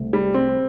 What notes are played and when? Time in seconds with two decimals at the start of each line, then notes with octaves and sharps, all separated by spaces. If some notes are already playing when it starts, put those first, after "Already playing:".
Already playing: C2 C3 A3
0.13 G3
0.34 C4